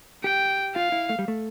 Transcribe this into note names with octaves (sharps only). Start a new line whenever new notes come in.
G4 G5
F4 F5
E4
A3
G3
A3